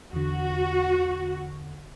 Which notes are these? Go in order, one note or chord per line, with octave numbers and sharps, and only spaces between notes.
E2 D3 F#4